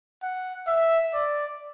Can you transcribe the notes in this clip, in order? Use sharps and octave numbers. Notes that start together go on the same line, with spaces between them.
F#5
E5
D5